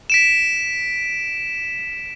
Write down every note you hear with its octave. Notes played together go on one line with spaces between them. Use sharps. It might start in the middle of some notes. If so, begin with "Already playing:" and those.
B6 D7 E7